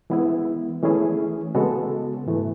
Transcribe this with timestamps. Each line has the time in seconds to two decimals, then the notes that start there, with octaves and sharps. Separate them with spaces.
0.10 E3 G#3 B3 E4
0.82 E3 A3 C#4 E4 G#4
1.55 C#3 G#3 B3 F#4 A4
2.26 G#2 E3 A3